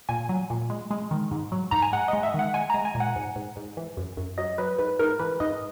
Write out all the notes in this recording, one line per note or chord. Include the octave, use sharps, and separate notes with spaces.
A#2 G#5
F#3
A#2
G#3
G#3
D#3
G#2
F#3
G#2 A#5
G#5
G#3 F#5
D#5
G#3
E5
D#3 F#5
G#3 G#5
G#3 A#5
G#5
A#2
F#5
G#2
G#2
G#2
E3
F#2
F#2
F#3 D#5
F#3 B4
G#2 B4
G#2 A#4
E3 B4
G#2 D#5